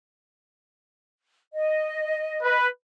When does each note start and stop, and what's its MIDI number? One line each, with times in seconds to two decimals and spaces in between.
1.54 2.56 75
2.43 2.68 71